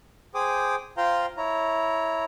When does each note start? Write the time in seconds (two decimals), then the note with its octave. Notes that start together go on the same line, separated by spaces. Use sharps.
0.35 G#4 C5 G5 D6 D#6
0.97 F4 C5 F5 G5 A#5 C6
1.37 E4 C#5 A#5